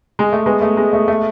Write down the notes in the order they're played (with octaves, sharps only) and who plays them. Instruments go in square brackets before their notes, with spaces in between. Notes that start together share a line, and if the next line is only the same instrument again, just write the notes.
[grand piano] G#3
A3
G#3 B3
A3
G#3
A3
A3